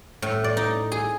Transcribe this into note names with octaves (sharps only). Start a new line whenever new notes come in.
A2
D5
D#4
G#4